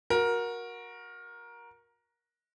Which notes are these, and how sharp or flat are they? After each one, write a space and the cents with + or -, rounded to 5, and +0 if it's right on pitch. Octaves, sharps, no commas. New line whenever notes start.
F#4 -15 A#4 +15